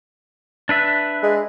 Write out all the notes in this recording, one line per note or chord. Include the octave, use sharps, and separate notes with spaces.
D4 B4 E5
G#3